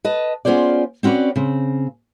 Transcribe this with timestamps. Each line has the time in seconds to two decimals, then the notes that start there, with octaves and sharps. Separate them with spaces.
0.05 B4 D#5 A5
0.45 B3 C#4 F4 G#4 C5 D5
1.03 C4 C#4 F#4 B4 D5
1.36 C#3 C4